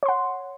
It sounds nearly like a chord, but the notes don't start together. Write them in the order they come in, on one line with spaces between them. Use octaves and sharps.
C#5 C6 F#5